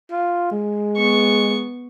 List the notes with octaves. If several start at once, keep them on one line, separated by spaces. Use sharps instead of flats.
F4
G#3
B3 C#6